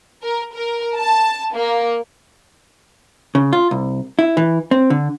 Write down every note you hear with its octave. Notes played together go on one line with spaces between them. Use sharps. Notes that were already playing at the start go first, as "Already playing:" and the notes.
A#4
A#4
A5
A#3
C#3
F4
C2
E4
E3
C4
D3